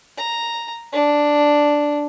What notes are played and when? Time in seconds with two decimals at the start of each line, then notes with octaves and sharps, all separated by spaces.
0.18 A#5
0.92 D4